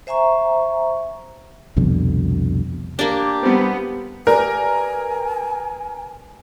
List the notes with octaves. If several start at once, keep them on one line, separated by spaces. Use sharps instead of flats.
C5 E5 G#5 A#5 C#6
C2 F2 B2 D3
A#3 D4 G4
G3 B3 C4
G4 A#4 B4 D5 G#5